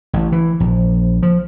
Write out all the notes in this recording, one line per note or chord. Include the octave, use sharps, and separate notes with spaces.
A1
E3
A#1
F3